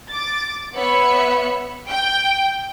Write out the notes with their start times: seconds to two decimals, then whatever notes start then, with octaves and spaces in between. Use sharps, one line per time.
0.10 D6 A6
0.75 B3 C#5 E5 B5 C#7
1.88 G5